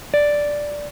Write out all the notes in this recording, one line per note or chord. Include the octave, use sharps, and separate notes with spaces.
D5